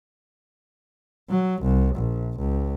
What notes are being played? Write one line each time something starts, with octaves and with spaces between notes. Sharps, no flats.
F#3
C2
A#1
C#2